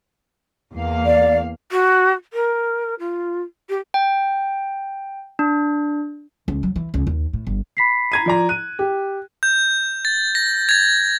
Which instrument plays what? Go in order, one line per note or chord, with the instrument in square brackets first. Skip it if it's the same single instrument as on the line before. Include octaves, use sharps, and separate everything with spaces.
[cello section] E2 A#3 F5
[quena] D5
[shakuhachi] F#4
A#4
F4
G4
[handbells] G5
D4
[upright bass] C#2
F#3
E3
C#2
D#2
A2
G1
[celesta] B5 B6 C7
[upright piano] A#5 G#6 D#7
F3 D5 A#5
[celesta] F#6 [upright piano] D#7
[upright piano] G4
[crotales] G6
A6
A#6
G#6 A6